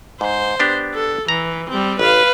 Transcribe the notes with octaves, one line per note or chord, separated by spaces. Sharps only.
G#2 C5
B3 D4 G4
A4
E3 A#5
G3 C4
A1 B4 F5